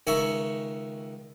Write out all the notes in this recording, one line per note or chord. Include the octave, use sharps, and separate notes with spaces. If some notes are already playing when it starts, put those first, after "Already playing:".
C#2 D#3 D#4 E5 G#5 C#6